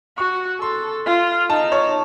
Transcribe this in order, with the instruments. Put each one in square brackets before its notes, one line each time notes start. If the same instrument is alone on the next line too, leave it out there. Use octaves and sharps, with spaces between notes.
[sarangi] F#4 [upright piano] C#6
[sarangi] A4 [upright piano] C6
[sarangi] F4
[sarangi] D#4 [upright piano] A5
[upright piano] C#5